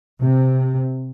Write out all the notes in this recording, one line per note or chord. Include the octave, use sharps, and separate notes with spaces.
C3